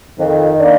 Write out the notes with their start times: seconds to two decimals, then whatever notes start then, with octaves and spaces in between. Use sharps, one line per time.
0.19 F2 D#3
0.60 A#3 D4